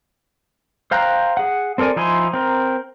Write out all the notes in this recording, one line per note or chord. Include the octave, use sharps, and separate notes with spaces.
C5 F5 G5 A#5 F#6
G#4 F#5
C4 A4 A#4 D5 G#5
F3 D#4 E4 G#5 C6
C4 A#4